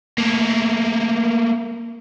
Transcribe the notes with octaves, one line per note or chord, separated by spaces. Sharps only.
A3 A#3